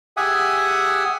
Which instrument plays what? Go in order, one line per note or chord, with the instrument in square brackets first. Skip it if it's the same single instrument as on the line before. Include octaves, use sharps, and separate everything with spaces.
[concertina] G4 G#4 E5 F#5 G#5 D#6